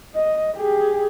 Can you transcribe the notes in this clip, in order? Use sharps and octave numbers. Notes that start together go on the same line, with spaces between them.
D#5
G4 G#4